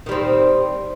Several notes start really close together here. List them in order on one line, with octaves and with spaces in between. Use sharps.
D#3 G3 C4